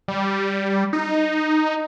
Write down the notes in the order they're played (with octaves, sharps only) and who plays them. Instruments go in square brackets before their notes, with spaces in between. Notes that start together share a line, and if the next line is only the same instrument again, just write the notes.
[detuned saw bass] G3
D#4